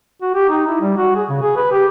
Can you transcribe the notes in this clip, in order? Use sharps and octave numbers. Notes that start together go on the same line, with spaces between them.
F#4
G4
D#4
E4
G3
F#4
G#4
C#3
G#4
B4
G4